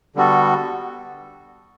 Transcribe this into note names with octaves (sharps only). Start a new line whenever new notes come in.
D3 G3 B3 F#4 A4